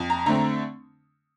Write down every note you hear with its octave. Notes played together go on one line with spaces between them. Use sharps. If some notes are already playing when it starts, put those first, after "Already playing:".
Already playing: F2
A#5
D3 A3 C4 A#5